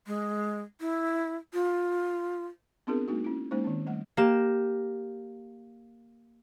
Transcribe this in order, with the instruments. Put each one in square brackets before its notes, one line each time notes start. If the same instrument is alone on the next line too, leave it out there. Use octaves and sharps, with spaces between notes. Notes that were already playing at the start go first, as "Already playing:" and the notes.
[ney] G#3
E4
F4
[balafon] B3 C4 D4 F4 G#4 A#4
G#3 A#3 D#4 F#4
C#4 E4
G#3 A#3 C#4 D#4 C5
D#3 C4
G3 A3 F#5
[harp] A#3 G4 E7